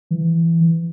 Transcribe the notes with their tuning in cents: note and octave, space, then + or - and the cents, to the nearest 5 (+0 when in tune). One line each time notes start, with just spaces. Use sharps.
E3 +10